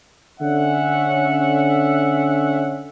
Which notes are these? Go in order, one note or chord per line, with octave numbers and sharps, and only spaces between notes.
D3 C#4 E5 F#5